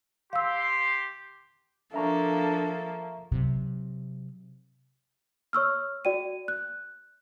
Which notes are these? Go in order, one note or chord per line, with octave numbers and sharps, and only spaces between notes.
G4 F5 C6 E6
F3 A#3 D4 A4 E5 A#5 C#6
C3 F#3
C#5 C#6 E6 F6
F#4 D5 G5 D#7
F#6